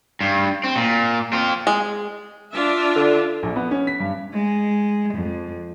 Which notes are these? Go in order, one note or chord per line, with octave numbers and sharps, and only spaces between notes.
G2
C4
A#2
C4 F4
G#3
D4 F4 E5
D3
A#1
B3
C#4
B6
G2
G#3
F2